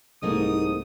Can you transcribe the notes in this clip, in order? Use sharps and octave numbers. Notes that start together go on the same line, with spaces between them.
C2 G#2 A3 A#3 D#4 D#6